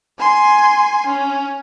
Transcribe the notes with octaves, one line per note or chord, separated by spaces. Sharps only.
G#5 C6
C#4